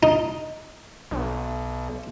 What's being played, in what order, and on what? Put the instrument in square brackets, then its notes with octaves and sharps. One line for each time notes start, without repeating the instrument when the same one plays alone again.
[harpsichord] D#4
[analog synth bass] B1